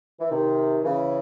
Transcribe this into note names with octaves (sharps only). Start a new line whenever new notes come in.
E3
C3 D#3
C#3 E3